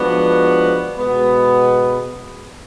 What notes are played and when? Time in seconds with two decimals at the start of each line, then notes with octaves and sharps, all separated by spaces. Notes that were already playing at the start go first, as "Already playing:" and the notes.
Already playing: F3 G#3 B3 D4 F#4
0.98 B2 G#3 B3